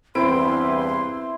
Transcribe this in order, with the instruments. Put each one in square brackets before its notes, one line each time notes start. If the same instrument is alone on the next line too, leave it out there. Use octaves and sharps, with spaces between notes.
[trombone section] E2 G2 B4 [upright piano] C4 D7 [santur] E4 [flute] C6